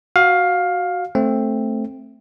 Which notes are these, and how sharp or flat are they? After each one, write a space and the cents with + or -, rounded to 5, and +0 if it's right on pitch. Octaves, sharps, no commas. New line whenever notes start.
F#4 +0 F5 +15
A3 +0 C4 +10